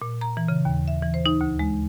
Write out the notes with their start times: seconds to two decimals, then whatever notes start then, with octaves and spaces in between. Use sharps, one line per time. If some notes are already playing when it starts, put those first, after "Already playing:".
0.02 A#2
0.21 A#5
0.37 E3
0.48 C#3
0.65 D#2
0.88 E5
1.03 E3
1.14 C5
1.26 D#4
1.41 D2
1.59 G#3